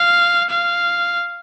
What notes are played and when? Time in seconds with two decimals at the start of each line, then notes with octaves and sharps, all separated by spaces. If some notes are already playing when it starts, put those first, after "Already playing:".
Already playing: F5
0.50 F5